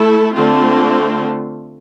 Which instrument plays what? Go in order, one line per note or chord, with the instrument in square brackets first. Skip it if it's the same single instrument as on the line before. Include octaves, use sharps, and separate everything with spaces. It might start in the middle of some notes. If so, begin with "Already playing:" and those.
Already playing: [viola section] A3 E4 A4
D3 A3 C4 F4